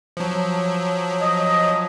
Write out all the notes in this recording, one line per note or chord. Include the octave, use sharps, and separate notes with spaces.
F3 F#3
D#5